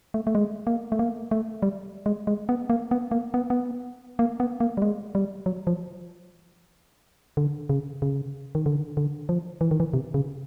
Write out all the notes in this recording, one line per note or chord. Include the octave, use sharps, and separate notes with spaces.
A3
A3
G#3
A#3
A3
A#3
A3
G3
G#3
G#3
B3
A#3
B3
A#3
B3
B3
A#3
B3
A#3
G3
G#3
G3
F#3
F3
D3
C#3
C#3
D#3
D3
D3
F3
E3
D#3
E3
C3
C#3